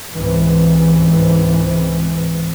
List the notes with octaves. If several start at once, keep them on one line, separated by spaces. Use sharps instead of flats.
C#2 G#2 E3 C4